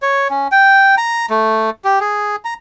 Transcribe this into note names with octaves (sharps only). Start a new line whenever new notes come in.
C#5
C#4
G5
A#5
A3
G4
G#4
A#5